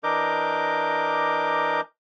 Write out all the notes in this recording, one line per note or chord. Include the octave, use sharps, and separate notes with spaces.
E3 D4 A#4 D#5 D6 G6